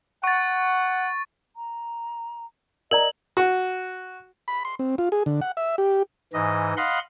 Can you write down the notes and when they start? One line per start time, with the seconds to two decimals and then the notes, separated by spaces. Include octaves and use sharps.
0.24 F#5 C#6 A6
1.56 A#5
2.91 A#4 D5 D#5 A#5 F#7
3.37 F#4
4.48 B5
4.65 C6
4.79 C4
4.98 F4
5.12 G#4
5.26 D3
5.41 F#5
5.57 E5
5.78 G4
6.33 G#2 E3 D#5
6.77 D#5 F5 F#5 B5 C6